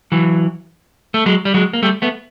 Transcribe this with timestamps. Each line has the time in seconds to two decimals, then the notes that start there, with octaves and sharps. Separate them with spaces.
0.12 E3 F#3
1.14 A3
1.26 F#3 G#3
1.45 G3
1.54 F#3 G#3
1.73 A#3
1.83 G3 A3
2.02 A3 B3